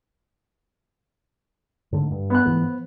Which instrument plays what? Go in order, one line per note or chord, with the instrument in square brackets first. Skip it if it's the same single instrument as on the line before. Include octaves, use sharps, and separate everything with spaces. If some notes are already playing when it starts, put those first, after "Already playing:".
[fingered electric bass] G#2 D3 A3
G2
[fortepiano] B3 F#6
[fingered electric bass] G#2 E3 A3
F3